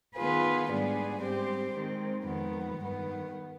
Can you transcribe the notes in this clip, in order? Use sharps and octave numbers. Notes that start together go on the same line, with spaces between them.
D#3 B3 F4 G#4 B4
G#2 G3 B3 D4 G#4
G#2 G3 C4 G4 C5
D#3 G#3 C4
F2 D#3 G#3 B3
G2 D#3 B3